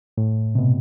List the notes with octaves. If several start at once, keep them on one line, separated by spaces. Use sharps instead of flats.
A2
C3
B2